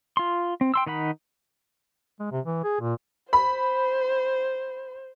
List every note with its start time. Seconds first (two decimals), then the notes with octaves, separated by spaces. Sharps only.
0.17 F4 C6
0.61 C4
0.74 G5 C6 E6
0.87 D#3 D#4 F#5 B5
2.19 G#3
2.31 C3
2.45 E3
2.64 G#4
2.80 A#2
3.33 C5 B5